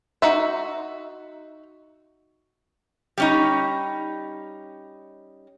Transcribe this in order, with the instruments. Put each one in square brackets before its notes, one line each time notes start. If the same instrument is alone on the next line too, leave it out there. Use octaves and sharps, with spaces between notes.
[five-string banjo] D#4 F#4 E5
[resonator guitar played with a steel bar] G3 C#4 D#4